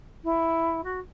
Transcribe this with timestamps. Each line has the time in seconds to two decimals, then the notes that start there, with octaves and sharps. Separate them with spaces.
0.24 E4
0.84 F#4